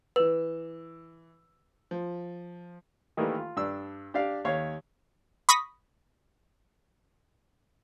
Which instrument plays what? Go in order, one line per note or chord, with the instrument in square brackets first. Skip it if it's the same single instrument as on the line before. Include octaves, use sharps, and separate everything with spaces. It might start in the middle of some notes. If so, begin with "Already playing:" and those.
[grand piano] E3 E6 [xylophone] B4
[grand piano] F3
[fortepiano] D#3 E3 G3 A3 A#3
F4
G2 D4 E6
D4 G4 D5 F5
D#2 C#5 F5
[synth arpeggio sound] B5 C#6 D#6 A#6 B6